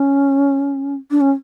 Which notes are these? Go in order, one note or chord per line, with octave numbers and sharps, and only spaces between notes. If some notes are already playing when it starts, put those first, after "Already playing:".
Already playing: C#4
D4
C#4